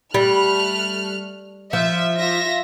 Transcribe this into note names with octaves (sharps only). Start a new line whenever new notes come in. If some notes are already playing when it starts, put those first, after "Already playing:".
G3 A3 F6 F#6
F3 E5
F4 E5 A#6